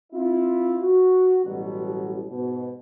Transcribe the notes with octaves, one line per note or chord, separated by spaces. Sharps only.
C4 E4 F4
F#4
A1 B2 F#3 G3
G#2 B2